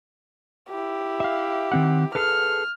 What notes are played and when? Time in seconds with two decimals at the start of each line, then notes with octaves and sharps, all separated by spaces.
0.69 E4 G4
1.20 E5 F5
1.72 D#3 C4 F#5
2.15 G#4 A4 B4 F6